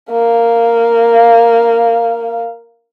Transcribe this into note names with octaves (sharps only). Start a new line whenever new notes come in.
A#3 F5